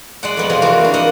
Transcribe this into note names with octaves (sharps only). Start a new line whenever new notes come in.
G#3 D5 F#5
F2 B3 F#5
C3 F3 B3
E3 A#3 F#4
A#3 D4
A#3 D#5 F#5